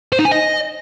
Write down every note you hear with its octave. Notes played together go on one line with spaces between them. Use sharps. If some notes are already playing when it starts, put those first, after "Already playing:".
C5
D#4
G#5
D#5